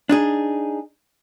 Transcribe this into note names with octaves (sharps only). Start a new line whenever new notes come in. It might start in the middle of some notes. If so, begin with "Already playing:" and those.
D4 D#4 G#4